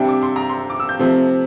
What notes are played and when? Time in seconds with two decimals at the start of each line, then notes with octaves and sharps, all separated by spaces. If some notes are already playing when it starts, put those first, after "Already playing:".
Already playing: C3 G3 D4 E5 G5
0.08 D6
0.23 C6
0.36 A#5
0.49 C6
0.70 D6
0.80 E6
0.89 G6
0.99 C3 F3 A3 C4